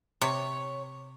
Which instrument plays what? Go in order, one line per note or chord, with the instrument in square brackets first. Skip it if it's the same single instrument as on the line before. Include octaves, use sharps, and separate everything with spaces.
[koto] C3 [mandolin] C#5